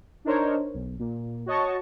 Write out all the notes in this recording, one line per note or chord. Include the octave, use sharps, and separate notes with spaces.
D4 D#4 A#4 C5 C#5
B1
A#2
F#4 C#5 D#5 A5 C#6